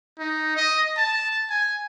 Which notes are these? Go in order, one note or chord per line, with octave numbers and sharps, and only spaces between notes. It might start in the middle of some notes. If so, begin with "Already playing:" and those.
D#4
D#5
A5
G#5